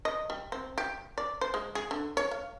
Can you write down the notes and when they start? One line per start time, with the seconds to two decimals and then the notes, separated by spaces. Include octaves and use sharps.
0.05 D#5
0.30 G3
0.52 C4
0.78 G4
1.18 D5
1.41 C5
1.54 G#3
1.75 G#4
1.91 D3
2.17 C#5
2.31 F5